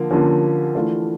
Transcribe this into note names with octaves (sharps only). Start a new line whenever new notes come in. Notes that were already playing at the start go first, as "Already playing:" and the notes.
Already playing: D3 F3 A#3
D3 F3 A#3 C#4
E3 A3 D4 F4